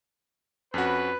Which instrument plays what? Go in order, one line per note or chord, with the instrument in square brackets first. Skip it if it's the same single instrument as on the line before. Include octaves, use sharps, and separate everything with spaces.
[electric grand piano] F2 C#4 F#4 [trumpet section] B4